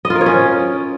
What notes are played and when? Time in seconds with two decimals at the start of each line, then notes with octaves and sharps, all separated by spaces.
0.05 D#5
0.10 F4
0.15 A#4
0.21 C#5
0.26 C#4